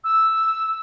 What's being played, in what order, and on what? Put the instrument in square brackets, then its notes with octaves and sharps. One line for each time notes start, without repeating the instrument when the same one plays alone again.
[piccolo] E6